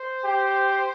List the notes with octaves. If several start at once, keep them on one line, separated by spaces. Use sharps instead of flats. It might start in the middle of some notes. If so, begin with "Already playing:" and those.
Already playing: C5
G4